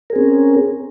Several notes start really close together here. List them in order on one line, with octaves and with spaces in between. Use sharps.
A#4 G#4 C4 C#4